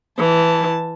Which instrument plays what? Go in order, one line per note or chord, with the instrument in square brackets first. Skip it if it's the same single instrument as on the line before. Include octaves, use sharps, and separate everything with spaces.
[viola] E3 A5